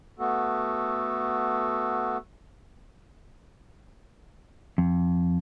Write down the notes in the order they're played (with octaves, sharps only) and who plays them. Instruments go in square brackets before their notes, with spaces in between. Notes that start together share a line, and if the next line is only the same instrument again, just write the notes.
[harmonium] A3 B3 F#4 A4
[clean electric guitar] F2